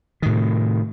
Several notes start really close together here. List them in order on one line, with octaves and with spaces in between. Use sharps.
D#3 A2 C3